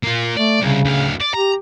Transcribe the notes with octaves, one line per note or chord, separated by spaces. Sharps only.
A#3 F4
A3 D5
C2 C#3
D2 F5
D5
G4 A#5